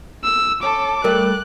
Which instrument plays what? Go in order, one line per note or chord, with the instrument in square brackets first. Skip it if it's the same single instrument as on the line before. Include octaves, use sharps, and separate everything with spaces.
[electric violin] E6
[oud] C#4 [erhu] A4 [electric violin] D6
[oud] G3 A3 [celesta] A#4 [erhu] F#6